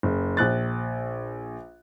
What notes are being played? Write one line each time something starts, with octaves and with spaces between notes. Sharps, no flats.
F#1
A#1 F#6 A6